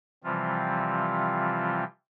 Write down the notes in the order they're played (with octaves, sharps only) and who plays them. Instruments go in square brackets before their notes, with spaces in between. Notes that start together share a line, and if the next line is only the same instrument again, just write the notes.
[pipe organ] C3 E3 F3 G3 C4 F4